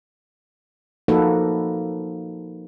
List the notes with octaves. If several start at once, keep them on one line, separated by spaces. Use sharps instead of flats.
F3 A#3 D#4 F#4 A4 B4